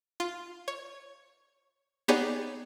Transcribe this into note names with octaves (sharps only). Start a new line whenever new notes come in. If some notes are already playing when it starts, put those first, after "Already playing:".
F4
C#5
B3 D#4 G4 G#4 C#5 D5